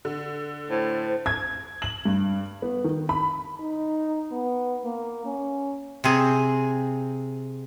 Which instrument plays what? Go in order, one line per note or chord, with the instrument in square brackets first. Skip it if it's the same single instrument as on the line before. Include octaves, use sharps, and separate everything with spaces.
[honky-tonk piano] D3
[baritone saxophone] A2 [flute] C5
[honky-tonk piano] G#6
F#7
G2
B3
D#3
B5
[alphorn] D#4
B3
A#3
C#4
[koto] C3 C4 G#4